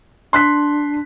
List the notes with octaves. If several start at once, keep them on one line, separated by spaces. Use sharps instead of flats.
D4 C6 F#6 B6